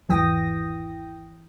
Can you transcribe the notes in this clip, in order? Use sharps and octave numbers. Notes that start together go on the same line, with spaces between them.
G#1 E2 E3 G5 D#6 A#6